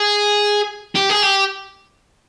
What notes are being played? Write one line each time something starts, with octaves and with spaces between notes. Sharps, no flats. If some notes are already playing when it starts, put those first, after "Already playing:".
Already playing: G#4
G4
G#4
G4